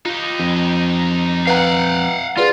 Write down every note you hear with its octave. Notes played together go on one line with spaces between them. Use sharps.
D#4 F4 G4
F2
B4 F5 F#5 A#5
F4 G#4 B4 D5